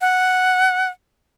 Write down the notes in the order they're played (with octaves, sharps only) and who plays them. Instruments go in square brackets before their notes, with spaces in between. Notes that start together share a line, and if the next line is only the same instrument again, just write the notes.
[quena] F#5